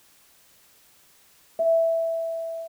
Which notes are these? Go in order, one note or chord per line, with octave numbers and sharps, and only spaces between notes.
E5